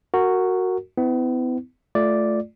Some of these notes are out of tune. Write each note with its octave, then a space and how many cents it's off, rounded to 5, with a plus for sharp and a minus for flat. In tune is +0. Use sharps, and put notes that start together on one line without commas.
F#4 +0 A#4 -20
B3 +40 E4 -15
A3 -10 F4 +0 D5 +0